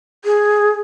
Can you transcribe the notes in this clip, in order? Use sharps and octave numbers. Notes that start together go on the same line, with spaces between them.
G#4